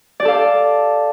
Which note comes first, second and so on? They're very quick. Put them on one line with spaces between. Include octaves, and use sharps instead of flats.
D5 G4 A4 F5